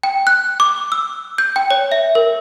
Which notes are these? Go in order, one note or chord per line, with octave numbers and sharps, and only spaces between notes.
G5
F#6
D6
E6
G6
G5
C#5
E5
A#4